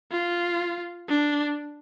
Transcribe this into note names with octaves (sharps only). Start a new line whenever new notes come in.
F4
D4